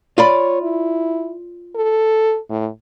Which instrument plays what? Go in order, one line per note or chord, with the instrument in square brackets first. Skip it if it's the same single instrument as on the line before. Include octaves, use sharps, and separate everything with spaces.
[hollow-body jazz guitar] F4 D5 B5 [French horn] C#5
[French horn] E4
A4
A2